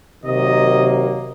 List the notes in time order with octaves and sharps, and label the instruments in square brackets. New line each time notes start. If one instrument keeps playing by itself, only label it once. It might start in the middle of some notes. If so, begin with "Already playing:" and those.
[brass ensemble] C3 D#3 F#3 A#3 D#5